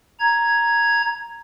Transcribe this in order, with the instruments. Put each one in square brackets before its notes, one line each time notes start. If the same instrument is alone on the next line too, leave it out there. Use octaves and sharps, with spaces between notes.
[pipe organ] A#5 G#6